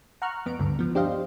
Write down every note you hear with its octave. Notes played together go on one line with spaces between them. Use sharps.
F#5 A#5 C#6 F6 F#6
F2 B3 D7
D2 G2 D3
F3 B3
D4 G4 C5 D#5 F5